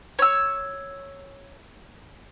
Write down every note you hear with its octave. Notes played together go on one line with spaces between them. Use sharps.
C#5 E6